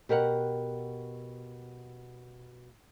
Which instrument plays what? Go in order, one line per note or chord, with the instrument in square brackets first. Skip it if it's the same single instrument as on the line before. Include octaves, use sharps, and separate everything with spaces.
[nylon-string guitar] B2 G4 A#4 D#5 F#5